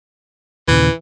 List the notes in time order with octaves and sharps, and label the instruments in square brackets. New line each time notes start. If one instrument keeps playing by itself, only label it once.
[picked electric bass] D#2 A#2 C#3 [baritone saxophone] E3